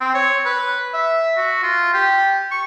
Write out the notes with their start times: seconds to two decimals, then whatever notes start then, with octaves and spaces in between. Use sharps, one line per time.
0.01 C4
0.15 C#5
0.45 B4
0.94 E5
1.37 F#4
1.63 F4
1.94 G4
2.51 C#6